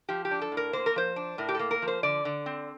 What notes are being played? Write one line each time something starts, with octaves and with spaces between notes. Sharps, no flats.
F3 G4
G4
D4
A4
A2
A#4
A#3 C5
A#4
F3 C5
D4
A2 A#4
G4
A#3 A4
A#4
F3
C5
D3 D5
D3
C4